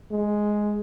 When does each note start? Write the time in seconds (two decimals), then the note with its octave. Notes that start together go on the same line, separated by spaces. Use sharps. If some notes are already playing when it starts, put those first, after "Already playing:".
0.11 G#3